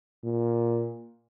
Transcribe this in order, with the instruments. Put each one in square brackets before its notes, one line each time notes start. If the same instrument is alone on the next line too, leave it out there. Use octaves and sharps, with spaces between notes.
[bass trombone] A#2